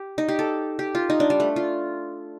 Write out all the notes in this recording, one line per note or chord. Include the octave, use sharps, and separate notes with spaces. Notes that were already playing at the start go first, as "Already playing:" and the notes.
Already playing: G4
D#4
G4
A4
G4
F4
D#4
D4
G3
A3
F4